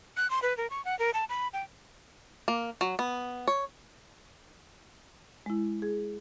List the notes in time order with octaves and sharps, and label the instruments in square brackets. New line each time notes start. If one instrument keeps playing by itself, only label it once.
[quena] F#6
C6
B4
A#4
C#6
F#5
A#4
A5
B5
G5
[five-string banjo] A#3
F#3
B3
C#5
[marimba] G#3 E4
G#4